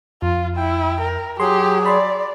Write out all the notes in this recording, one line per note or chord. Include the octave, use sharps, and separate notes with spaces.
F2 F4
E4 G5
A#4
F#3 G4 G#4 C6
D5 B5 C6